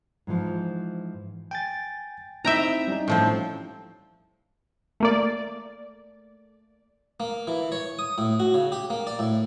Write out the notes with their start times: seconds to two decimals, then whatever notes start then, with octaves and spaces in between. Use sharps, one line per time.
0.27 G#2 E3 F3
1.51 G5 G#5 A6
2.45 C4 D#4 E4 E5 G5 A#5
2.88 G3 C#4 D#4
3.08 A2 F3 C4
5.00 A3 A#3 D5
7.20 A#3
7.47 E3
7.72 C#5
7.99 D#6
8.18 A2
8.40 F#4
8.54 C#3
8.72 G4
8.90 A#3
9.07 D5
9.19 A2